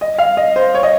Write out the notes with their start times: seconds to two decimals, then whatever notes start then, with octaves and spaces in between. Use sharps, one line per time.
0.01 D#5
0.18 F5
0.37 D#5
0.56 C5
0.75 C#5
0.83 D#5